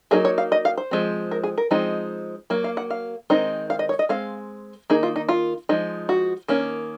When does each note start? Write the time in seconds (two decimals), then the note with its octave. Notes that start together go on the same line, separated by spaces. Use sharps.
0.11 F#3 A#3 D#4 G#4
0.25 C#5
0.38 F5
0.52 D#5
0.65 F5
0.78 C5
0.91 F3 G#3 C4
1.31 A#4
1.44 G#4
1.58 A#4
1.71 F3 G#3 C4 D#4
2.50 F#3 A#3
2.64 F5
2.77 F#5
2.90 F5
3.30 D#3 G#3 C4 D#4
3.70 F5
3.79 D#5
3.89 C#5
3.99 D#5
4.09 G#3 C4 F5
4.90 D#3 A#3 D#4 G#4
5.03 F4
5.16 D#4
5.29 F4
5.69 F3 G#3 D#4
6.09 F#4
6.48 D#3 A#3 C#4